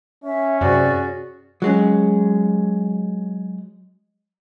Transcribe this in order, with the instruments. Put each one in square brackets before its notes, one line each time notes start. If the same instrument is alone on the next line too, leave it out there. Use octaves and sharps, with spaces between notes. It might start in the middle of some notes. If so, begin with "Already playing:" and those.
[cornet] C#4 [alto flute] E5
[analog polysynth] F#2 C3 [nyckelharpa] F#4 G#4 [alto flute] D5
[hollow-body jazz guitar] F#3 G#3 C#4